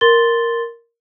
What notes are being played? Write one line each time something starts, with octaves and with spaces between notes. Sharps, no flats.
A#4 C6 A6 G7